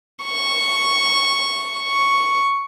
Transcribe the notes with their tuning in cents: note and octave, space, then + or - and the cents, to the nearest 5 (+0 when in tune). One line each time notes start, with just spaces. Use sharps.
C#6 -5
C#6 +0